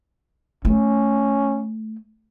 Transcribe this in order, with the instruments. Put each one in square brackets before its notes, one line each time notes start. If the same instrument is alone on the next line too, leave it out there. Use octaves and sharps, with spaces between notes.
[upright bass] A3 [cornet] C#4